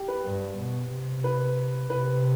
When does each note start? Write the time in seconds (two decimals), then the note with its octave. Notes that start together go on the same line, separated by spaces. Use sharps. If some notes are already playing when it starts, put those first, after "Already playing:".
Already playing: G4
0.08 B4
0.25 G2
0.58 B2
0.91 C3
1.24 B4
1.90 C3 B4